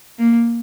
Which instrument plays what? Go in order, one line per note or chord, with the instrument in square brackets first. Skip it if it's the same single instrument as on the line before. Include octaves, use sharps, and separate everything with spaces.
[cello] A#3